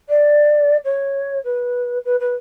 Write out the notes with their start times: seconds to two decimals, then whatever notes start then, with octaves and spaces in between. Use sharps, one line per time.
0.09 D5
0.84 C#5
1.44 B4
2.05 B4
2.20 B4